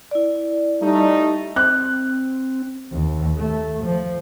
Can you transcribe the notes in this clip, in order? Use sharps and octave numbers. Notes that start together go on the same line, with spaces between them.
E4 D5
G3 A3 D#4
C4 F#6
D#2
A3
F3